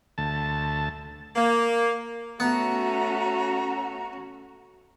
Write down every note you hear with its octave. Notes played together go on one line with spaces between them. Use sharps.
D2 A5
A#3
A3 B3 C#4 F#4 A#5